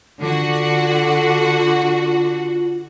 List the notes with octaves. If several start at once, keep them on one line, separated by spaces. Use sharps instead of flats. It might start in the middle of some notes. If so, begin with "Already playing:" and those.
D3 F4 F#4 F#5